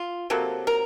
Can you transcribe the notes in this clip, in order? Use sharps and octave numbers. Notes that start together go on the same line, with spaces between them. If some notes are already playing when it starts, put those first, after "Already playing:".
Already playing: F4
C3 F#3 A#3 A4
A#4